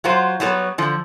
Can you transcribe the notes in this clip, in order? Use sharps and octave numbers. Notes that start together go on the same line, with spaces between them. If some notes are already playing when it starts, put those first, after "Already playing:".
F#3 F4 F#4 C5
F#3 G3 B3 B4 C#5
D3 F3